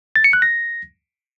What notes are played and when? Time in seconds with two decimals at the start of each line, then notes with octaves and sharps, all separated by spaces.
0.16 A6
0.24 C#7
0.33 F#6
0.42 A#6